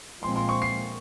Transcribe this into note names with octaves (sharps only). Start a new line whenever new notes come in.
A#2 F3 G#3 C4 C6
C6
C#6
C7